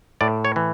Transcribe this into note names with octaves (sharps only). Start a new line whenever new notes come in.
A2 D5
C#5
E3